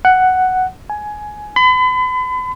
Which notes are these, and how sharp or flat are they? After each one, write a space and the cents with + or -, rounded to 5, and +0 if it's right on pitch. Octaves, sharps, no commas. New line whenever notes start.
F#5 +5
G#5 +15
B5 +40